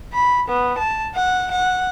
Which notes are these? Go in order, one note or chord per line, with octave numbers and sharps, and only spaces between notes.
B5
B3
A5
F#5
F#5